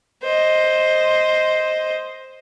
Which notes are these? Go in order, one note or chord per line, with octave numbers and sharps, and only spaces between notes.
C5 D#5